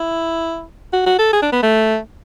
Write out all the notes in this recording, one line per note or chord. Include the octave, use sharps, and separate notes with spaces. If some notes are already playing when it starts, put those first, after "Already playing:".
Already playing: E4
F#4
F#4
A4
G#4
D4
B3
A3